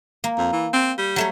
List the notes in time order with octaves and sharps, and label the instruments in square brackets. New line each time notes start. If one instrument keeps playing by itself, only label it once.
[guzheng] A#3
[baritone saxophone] F2
E3
C4
G3
[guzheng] F#3 A3 C#5